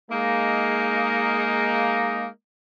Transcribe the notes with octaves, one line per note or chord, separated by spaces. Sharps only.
G#3 A#3 D#4